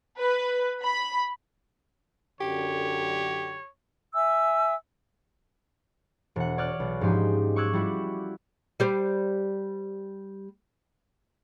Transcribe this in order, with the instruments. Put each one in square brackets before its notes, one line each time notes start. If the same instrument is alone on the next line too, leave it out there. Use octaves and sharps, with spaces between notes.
[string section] B4
B5
[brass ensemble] F#2 D3 [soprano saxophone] G4 [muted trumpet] C#5
[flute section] E5 G#5 E6
[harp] E1 F#5
C#5 D5 F6 F#6
B1
G#2 F3 C#4 D#4 G4 C6
C#6 D6 E6 F#6 G#6
G3 E4 F#4
[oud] G3 G4 C5